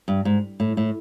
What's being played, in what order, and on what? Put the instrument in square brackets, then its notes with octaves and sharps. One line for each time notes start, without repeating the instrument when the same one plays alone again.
[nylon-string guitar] G2
G#2
A2
A2